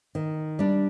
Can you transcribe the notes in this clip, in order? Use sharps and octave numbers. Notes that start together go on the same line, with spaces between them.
D#3
G3 D4